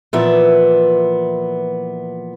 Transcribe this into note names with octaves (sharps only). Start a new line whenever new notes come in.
A#2 E3 F3 B3 E5